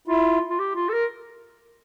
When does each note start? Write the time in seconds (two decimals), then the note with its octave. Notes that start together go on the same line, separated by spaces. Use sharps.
0.07 E4 F4
0.50 F4
0.59 G4
0.75 F4
0.89 A4
0.93 A#4